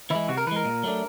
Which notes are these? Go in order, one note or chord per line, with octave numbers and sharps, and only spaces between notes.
E3 G#3 E4
C3 F#4
A#4
E3 G#3 B4
A#4
A#2
F#3 A3 D4